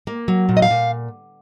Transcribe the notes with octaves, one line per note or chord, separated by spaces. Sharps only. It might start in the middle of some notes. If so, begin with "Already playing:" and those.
A#3
F#3
A#2
D#5
F5
A#2